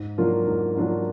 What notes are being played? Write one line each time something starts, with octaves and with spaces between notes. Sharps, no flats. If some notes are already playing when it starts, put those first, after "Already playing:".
Already playing: G#2
F#3 A#3 D4 F4
G#2
F#3 A#3 D4 F4